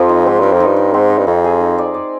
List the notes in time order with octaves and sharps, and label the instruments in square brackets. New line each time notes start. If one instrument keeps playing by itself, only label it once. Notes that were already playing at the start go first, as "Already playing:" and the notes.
Already playing: [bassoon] F2 [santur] F3 C4 G4
[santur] D#4
[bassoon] G#2 [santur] C4
[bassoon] G2 [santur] A#4
[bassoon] F2
[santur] D#4
[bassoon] G2
[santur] D#4
[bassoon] G#2 [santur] C4
[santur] D#4
[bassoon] G2
[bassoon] F2 [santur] D#4
[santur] G#4
D#4
D5
D5